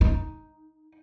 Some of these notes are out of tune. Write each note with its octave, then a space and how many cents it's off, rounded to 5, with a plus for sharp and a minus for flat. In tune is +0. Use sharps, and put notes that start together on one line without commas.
D#4 +5